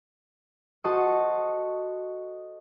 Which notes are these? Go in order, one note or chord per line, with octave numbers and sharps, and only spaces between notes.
F#4 A4 C5 D#5 C#6 D#6